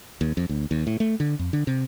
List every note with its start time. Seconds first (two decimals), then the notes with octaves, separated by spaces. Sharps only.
0.21 D#2
0.37 F2
0.49 D2
0.71 D#2
0.87 A2
1.00 A3
1.20 D3
1.39 F2
1.53 D3
1.67 C3